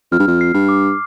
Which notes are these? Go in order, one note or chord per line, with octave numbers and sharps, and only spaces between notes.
F2 F6
G2
F2
C7
G2
D6